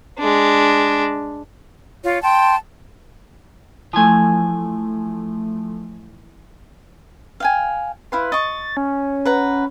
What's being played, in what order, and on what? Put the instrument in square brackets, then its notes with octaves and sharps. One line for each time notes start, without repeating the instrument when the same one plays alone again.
[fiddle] G#3 D4
[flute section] F4 C#5
G5 A5 C6
[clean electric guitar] E3 G#5 [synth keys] F3 A3
[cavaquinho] F5 G5 G#5
[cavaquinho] E4 F5 C6 [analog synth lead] B4
[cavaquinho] D#5 C#6 [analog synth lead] A6
[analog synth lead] C#4
[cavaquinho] B4 F#5 A#5